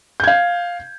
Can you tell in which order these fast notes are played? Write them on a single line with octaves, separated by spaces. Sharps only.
G6 G#6 F5